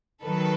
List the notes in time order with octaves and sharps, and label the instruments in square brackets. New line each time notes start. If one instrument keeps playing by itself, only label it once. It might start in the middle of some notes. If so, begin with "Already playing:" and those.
[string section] D#3 F#3 A4 B4